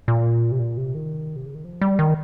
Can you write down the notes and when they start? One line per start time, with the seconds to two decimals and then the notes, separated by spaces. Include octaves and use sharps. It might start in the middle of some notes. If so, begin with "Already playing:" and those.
0.08 A#2
0.52 C3
0.59 A#2
0.77 C3
0.95 D#3
1.36 C3
1.46 C#3
1.55 D#3
1.65 F3
1.81 G3
1.99 D#3